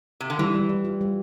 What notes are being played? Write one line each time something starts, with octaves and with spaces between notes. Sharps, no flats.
C3
D3
E3 G3
G3
G3
F4
G3